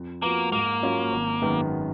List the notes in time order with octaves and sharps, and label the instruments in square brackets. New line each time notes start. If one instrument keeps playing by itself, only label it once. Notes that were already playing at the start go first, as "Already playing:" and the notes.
Already playing: [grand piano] F2
[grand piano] F3 B3 F#4 [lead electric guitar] A#3
[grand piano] G#2 [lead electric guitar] A#3
[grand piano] F#3 C#4 F4
G#1
F#2 D#3 G#3 B3